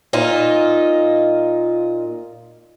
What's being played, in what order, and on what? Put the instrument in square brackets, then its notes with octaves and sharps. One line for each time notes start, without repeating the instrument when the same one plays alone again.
[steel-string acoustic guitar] A#2 D#4 F4